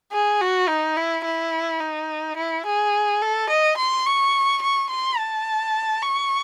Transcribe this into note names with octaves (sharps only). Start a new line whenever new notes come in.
G#4
F#4
D#4
E4
E4
D#4
E4
G#4
A4
D#5
C6
C#6
C#6
C6
A5
C#6